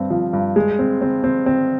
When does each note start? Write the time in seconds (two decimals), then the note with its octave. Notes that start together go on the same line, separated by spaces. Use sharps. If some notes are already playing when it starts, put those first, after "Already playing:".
Already playing: G2 C4
0.10 F3
0.33 G2
0.56 G#3
0.79 C4
1.01 C4
1.24 C4
1.46 C4